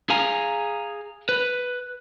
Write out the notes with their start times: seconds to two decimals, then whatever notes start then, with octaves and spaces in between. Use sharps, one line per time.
0.10 G#4 F5 G#5 A#5
1.29 B4